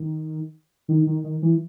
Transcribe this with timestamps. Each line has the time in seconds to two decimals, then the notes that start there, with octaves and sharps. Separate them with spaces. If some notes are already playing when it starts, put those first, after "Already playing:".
Already playing: D#3
0.88 D#3
1.07 D#3
1.24 D#3
1.42 E3